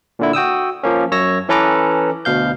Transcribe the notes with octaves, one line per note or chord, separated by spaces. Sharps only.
A#2 D3 E4
F#4 G5 D#6 E6
F3 A#3 C#4
F#2 C#5 E6 A#6
E3 C#4 A4 B4 A#5 D6
D2 B2 F5 G6